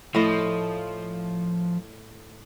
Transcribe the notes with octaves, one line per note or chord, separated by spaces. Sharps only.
A2 F3 D#5